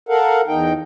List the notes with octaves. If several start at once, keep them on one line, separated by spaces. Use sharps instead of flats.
A4 A#4 F5 F#5
E2 D#4 G5